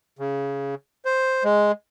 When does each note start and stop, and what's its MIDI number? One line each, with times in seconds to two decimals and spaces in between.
0.19 0.75 49
1.05 1.44 72
1.44 1.72 56